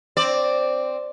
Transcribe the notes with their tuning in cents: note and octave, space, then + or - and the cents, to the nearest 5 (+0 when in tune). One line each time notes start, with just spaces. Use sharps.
C4 +0 D5 +0